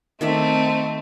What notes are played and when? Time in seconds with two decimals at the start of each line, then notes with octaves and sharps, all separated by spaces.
0.21 D#3 A3 C4 D5 E5